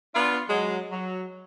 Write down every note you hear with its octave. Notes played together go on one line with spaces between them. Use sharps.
B3 D4 F4
F#3 G#3
F#3